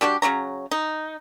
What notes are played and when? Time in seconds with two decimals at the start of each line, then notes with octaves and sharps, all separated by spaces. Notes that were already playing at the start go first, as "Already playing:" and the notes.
0.01 G3 D4 F#4 G4
0.22 C#3 F#3 C#5 A#5
0.71 D#4